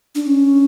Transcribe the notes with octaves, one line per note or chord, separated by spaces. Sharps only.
D4
C#4